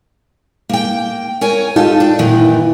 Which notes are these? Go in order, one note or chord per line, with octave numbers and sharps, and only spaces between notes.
A#3 G5
A#4 C#5 G#5
D#4 F4 G4 A4
D4
F#2 A#2 D#3 E3